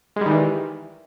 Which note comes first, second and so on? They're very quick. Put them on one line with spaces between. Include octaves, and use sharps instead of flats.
G#3 G3 D#3 E3